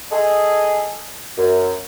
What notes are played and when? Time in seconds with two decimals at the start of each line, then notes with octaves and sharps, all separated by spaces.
0.11 G#4 A4 D#5
1.37 F#2